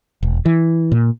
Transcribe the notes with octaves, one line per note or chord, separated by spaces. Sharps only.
E1
E3
A#2